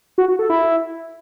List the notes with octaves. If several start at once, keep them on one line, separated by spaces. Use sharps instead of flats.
F#4
F#4
A4
E4